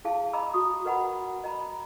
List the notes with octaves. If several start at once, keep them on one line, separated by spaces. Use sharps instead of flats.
E4 G#4 F5 A5
D#5 A#5 B5 D6 E6
F#4 C#6 D#6
A#4 B4 D#5 F#5 A#5 B5
D#5 A#5 B5